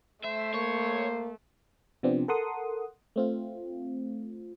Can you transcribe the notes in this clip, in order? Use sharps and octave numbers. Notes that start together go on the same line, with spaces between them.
A3 C5 E5
A#3 C#5
C3 F3 B3 C4 D4
A4 A#4 F#5 C6 D#6
A3 C4 F4